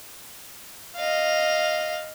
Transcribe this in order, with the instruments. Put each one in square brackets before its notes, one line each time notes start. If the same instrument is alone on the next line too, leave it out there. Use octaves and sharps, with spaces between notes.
[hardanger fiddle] D#5 F5